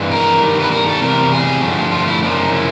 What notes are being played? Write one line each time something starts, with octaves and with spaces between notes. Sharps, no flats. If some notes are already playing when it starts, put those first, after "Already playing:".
Already playing: G2 E3 G#3
A#4
G2 D#3 G3
B4
A#4
A4
E2 C3 G3 A#4
G#4
G2 D3 F3 A3
F4
E4
F#2 C#3 F3 A#3 D4
D#4
E4